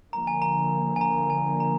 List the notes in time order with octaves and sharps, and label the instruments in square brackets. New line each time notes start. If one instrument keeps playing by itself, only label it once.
[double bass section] D3 F3 A#3 [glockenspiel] A#5
[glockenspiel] G#5
A#5
G#5
A#5
G#5
A#5